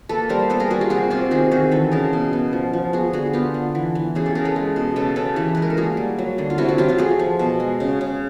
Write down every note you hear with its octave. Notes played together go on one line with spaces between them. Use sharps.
A#3 A4 B4
G3 A#4 C5
B3 A4 B4
G#4 A#4
G3 F#4 G#4
F4 G4
C3 F#4 G#4
C3 F4 G4
D#3 F#4 G#4
D#3 F#4 G#4
E3 A4 B4
C#3 G#4 A#4
B2
B3
F3
F3
B3 F#4 G#4
D3 F#4 G#4
B3 F4 G4
D3
E3
E3
C#3 F#4 G#4
G4 A4
C#3 G#4 A#4
A4 B4
G#3
B2
C#3 A4 B4
C#3 A4 B4
E3 G4 A4
G#3 B4
A#4
A4
A#3 F#4 G#4
G3
F#3
D3
F4
C3 E4 F#4
E4 F#4
F#3 F4 G4
F4 G4
A3 F#4 G#4
F3
B2
G#3
C#3
C#3